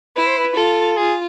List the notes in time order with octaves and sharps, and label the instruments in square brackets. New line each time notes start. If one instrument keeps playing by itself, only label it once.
[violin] E4 [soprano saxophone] B4
[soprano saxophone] C5
B4
[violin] F4 [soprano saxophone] A4
[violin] F4 [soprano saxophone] G#4